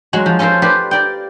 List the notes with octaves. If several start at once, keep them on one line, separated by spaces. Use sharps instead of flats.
F#3 G#3 F#4
F3
C#4 F4 A4 A#4 C5
G4 B4 C5 D5
A#4 D5 G5